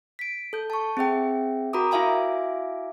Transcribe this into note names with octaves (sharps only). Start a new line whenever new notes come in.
B6 D7
A4 G6
A5 C#6
C4 G#4 E5 G5
F#4 A#4 A#5 B5 D6 D#6
E4 F#4 E5 F5 G#5 D6